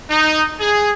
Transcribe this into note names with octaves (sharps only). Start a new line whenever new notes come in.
D#4
G#4